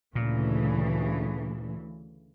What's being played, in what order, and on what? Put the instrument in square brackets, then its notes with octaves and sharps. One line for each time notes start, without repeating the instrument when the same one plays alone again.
[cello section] D2 C#3 E3 [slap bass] A#2